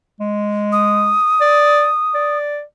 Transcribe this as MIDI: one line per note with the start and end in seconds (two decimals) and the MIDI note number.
0.20 1.15 56
0.72 2.38 87
1.41 1.89 74
2.14 2.62 74